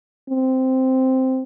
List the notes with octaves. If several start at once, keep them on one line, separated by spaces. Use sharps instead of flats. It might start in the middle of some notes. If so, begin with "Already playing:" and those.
C4